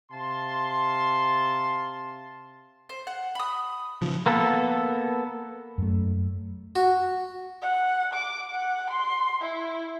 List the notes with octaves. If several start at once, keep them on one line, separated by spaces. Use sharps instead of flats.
C3 F5 A5 C6
C5
F#5
B5 D#6
C#3 F3
A#3 B3 A4
F#2 A3
F#4
F#5
D6
F#5
C6
E4